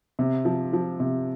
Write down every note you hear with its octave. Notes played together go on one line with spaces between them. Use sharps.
C3
F3
F3
C3